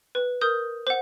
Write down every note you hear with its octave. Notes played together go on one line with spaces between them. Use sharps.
B4
A#4 D#6 G6
C5 F#5